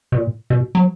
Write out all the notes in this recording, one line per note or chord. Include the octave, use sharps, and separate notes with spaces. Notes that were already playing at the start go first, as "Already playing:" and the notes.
B2
A#2
B2
F#3